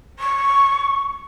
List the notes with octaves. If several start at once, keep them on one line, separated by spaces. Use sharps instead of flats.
C#6